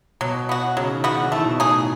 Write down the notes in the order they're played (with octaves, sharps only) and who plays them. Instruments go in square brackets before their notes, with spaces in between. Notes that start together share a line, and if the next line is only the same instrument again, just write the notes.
[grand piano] B2 [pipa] F#3
[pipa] B3 F#4
[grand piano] C#3 [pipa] F#3
[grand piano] D#3
[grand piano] D#3 [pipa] B3 F#4
[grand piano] E3
[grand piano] D#3 [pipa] A3
[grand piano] B2
[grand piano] A2 [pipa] D#4 G#4